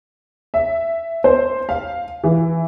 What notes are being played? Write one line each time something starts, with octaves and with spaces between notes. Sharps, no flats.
E5
C5
F5
E3